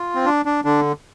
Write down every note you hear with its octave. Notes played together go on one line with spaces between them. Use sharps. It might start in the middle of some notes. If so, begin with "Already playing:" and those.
Already playing: F4
C4
D4
D4
D3 D4